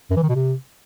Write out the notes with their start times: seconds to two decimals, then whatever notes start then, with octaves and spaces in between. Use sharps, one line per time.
0.10 F#2
0.17 E3
0.23 D#3
0.29 B2
0.35 C3